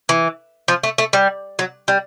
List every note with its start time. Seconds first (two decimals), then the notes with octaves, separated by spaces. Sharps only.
0.09 E3
0.68 F3
0.83 A3
0.98 A3
1.13 G3
1.59 F#3
1.88 G3